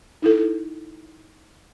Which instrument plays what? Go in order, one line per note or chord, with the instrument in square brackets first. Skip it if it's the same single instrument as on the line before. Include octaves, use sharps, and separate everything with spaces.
[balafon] D#4 E4 A4